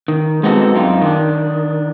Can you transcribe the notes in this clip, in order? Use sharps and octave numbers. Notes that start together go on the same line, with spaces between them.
D#3
G#3 B3 C4 D#4 F#4 A4
F#2 C4 D#4 F4
D#3 D4